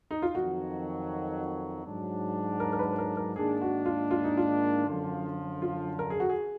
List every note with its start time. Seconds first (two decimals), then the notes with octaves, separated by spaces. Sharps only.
0.11 D#4
0.22 F4
0.35 F2 D#3 F#3 F#4
1.85 G#2 F#3 D4
2.60 A#4
2.73 A#4
2.79 B4
2.98 A#4
3.17 A#4
3.36 G#2 D#3 A#3 D4 G#4
3.62 F#4
3.86 F4
4.11 F4
4.24 D#4
4.37 F4
4.86 F#2 D3 F3
5.62 F4
5.99 A#4
6.10 G#4
6.20 F#4
6.29 G#4